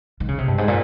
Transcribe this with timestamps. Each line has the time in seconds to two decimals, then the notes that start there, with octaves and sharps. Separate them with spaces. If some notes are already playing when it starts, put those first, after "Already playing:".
0.20 D#3
0.28 C#3
0.38 C3
0.48 G2
0.58 G#2
0.68 A#2